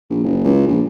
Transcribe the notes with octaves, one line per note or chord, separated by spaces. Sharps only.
A#1
F#1
C#2
A#1